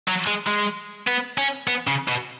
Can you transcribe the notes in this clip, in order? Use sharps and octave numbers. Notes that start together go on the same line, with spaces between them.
F#3
G#3
G#3
B3
C#4
B3
C#3
B2